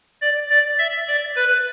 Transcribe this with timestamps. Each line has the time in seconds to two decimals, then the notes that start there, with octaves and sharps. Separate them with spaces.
0.22 D5
0.50 D5
0.79 E5
1.08 D5
1.36 B4